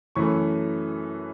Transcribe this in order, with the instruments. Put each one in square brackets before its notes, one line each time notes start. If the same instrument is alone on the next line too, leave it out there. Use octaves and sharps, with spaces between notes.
[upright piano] F#2 E3 A3 C#6